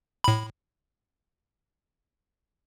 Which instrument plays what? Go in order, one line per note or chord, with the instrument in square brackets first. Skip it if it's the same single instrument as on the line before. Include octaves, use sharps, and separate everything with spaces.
[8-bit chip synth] A2 B5